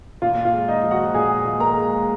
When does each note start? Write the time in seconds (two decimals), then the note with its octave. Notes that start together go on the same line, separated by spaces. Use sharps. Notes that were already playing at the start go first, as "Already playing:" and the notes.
0.22 A#2 F4
0.45 F4
0.53 G#3
0.68 D#4 D#5
0.83 F3
0.91 F#4 F#5
1.14 A#2 G#4 G#5
1.45 A#2
1.60 A#4 A#5
1.76 G#3